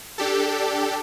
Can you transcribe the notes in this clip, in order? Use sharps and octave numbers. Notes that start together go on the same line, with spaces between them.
D4 G4 A4